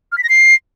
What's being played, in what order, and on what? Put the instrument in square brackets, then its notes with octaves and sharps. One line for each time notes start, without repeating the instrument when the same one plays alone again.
[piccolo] F6
B6
A#6
C7